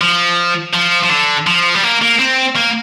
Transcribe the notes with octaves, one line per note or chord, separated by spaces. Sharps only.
F3
F3
F3
D3
F3
G3
A#3
A#3
C4
A#3